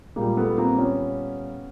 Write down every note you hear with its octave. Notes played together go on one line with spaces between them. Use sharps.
A#2 G3 G#3 A#3
A3 B3
A#3 C4
B3 C#4